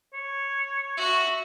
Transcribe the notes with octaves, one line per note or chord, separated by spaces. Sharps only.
C#5
F#4 E5